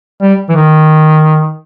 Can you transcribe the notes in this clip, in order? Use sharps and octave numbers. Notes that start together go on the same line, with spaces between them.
G3
E3
D#3